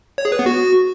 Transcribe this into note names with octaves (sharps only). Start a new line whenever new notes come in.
C#5
G#4
B4
B3
F#4